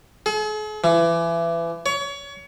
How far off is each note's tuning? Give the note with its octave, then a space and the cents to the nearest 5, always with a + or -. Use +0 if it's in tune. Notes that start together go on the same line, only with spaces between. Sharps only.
G#4 +45
E3 +30
C#5 +30